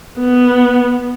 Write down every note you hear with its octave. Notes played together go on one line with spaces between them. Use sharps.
B3